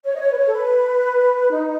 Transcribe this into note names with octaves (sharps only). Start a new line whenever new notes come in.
C#5
D#5
C#5
B4
C#5
A4
B4
D#4